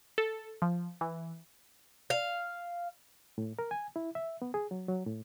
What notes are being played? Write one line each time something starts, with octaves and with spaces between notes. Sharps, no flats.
A4
F3
E3
F5
A2
A#4
G#5
E4
E5
B3
G#4
F#3
F#3
A2